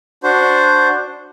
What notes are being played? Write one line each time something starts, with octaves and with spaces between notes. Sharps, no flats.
D4 F#4 C5